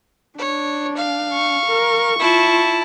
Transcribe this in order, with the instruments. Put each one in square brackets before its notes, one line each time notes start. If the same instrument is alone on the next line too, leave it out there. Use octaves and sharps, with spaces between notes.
[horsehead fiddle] D4 [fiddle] C#5
[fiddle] F5
[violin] C#6
[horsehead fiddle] A#4
[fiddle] E4 A5 [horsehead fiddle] F4